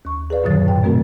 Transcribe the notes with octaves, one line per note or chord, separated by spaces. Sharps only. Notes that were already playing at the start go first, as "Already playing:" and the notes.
D#2 C#6
G#4 B4 D5 F5
F#2 A#2 D3 D#3 F#3 A6
F#2 A2 G5
B2 A3 C4 F#4 A#4